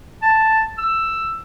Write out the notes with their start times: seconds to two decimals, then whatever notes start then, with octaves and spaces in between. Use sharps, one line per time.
0.23 A5
0.78 E6